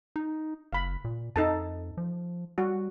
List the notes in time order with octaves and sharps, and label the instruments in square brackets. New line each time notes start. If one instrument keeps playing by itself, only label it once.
[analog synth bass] D#4
[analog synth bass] F#1 [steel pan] F5 B5
[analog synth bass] A#2
[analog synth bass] F2 [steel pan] D#4 A4 A5
[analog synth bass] F3
[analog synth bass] G3 [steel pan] F#4